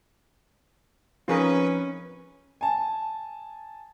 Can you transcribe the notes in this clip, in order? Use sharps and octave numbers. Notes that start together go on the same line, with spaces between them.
F3 C4 C#4 D#4 F4 G#4 A#4 B4
G#5 A5